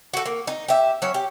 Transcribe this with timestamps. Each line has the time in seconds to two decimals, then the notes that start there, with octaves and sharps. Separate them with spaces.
0.13 F#4 A4
0.26 A#3
0.47 D#4
0.68 G4 E5
1.02 F#3 C#4 C#5
1.14 G4